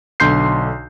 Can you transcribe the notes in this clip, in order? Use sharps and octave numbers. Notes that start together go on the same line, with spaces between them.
B1 D3 C6 G6 C7